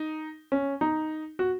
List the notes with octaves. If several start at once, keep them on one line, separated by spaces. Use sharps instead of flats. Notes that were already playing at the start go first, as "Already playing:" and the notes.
Already playing: D#4
C#4
D#4
F#4